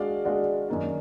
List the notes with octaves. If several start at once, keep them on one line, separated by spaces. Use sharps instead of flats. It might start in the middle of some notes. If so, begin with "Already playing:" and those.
Already playing: G#3 D4 F#4 D5 F5
G#3 D4 F#4 D5 F5
F#2 D#3 A#3 D4